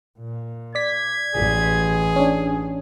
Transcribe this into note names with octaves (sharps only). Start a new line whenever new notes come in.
A#2
D5 G#6 B6
A1 G#4
C#4 D4